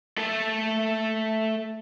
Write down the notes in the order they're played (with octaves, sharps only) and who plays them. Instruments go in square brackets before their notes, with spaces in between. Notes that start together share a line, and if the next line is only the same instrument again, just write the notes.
[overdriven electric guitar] A3 A4